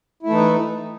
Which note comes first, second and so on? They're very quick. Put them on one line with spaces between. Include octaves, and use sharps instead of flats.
E4 A3 E3 D#4